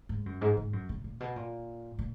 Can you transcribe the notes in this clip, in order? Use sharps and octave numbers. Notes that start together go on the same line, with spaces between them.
G#2
F#2
G#2
G#2
F#2
A#2
A#2
B2
A#2
A#2